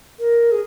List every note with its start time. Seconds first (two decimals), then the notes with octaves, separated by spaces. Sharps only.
0.19 A#4
0.52 G#4